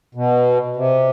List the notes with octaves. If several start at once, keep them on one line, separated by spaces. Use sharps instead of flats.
B2
C3